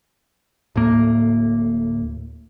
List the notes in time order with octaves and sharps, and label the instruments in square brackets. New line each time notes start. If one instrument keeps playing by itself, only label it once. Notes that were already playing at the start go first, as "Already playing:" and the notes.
[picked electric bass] D1 A2 A#3